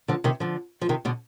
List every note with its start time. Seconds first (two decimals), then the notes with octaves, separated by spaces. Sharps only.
0.08 D3 F3
0.24 C3 D#3
0.40 D3 F3
0.81 F3
0.89 C3 D#3
1.05 B2 D3